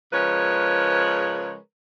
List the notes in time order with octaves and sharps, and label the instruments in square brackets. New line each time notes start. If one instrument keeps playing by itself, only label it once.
[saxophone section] C#3 F3 G#3 A#4 B4 C#5